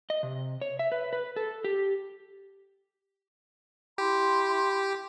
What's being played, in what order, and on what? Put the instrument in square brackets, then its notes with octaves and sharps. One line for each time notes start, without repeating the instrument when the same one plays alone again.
[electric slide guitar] D#5
C3
C#5
E5
B4
B4
A4
G4
[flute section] E4 B5 C6 [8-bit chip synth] G4